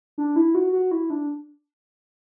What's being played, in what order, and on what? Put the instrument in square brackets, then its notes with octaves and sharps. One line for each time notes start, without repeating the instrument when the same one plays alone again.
[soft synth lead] D4
E4
F#4
F#4
E4
D4